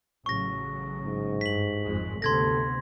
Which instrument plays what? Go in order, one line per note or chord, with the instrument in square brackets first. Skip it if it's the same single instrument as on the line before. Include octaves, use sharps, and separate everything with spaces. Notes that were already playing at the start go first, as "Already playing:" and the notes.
[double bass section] A1 C#3 F#3 [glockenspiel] C#6 A#6
[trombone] G#2
[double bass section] G2 [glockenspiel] B6 F#7
[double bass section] G#1 F2 G#3
[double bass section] D2 C3 B3 [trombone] A4 [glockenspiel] C6 G#6 A#6